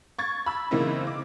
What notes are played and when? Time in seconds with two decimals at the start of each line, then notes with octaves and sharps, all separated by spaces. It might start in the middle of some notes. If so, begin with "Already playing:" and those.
0.19 C#6 G#6 A6
0.46 B5 E6
0.71 C#3 E3 A#3 C4 D#4 E4
1.07 D6